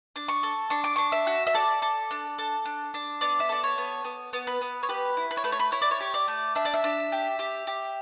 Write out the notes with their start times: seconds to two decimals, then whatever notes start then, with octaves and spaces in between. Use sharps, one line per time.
0.16 D4
0.28 C#6
0.43 A4
0.70 D4 C#6
0.84 D6
0.96 D4 C#6
1.12 E5
1.27 F#4
1.47 E5
1.55 A4 D5
1.82 A4
2.11 D4
2.38 A4
2.65 D4
2.94 D4
3.21 B3 D5
3.40 E5
3.49 A4 D5
3.63 C#5
3.78 B3
4.05 B3
4.33 B3
4.47 B4
4.61 B3
4.83 C#5
4.89 G4 B4
5.17 E4
5.31 B4
5.37 C#5
5.44 A3 B4
5.52 C#5
5.59 B4
5.72 E4 C#5
5.82 D5
5.91 C#5
6.00 G4
6.14 D5
6.28 A3
6.55 D4 E5
6.65 D5
6.74 E5
6.84 D4
7.12 G4
7.39 G4
7.67 G4